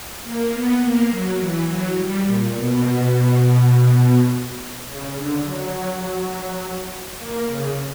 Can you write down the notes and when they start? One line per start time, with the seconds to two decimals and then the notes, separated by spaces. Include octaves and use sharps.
0.24 A#3
0.52 B3
0.81 A#3
1.10 F#3
1.39 E3
1.68 F#3
1.97 G3
2.26 A#2
2.54 B2
4.86 C#3
5.15 D3
5.44 F#3
7.18 A#3
7.47 C#3